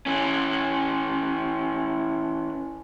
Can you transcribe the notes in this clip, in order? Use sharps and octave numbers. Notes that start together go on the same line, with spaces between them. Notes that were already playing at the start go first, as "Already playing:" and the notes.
E3 C#4